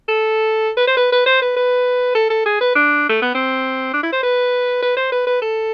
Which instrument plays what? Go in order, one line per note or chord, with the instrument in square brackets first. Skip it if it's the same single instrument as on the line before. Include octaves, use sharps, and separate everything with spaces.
[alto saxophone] A4
B4
C5
B4
B4
C5
B4
B4
A4
A4
G#4
B4
D4
A3
B3
C4
D4
E4
C5
B4
B4
C5
B4
B4
A4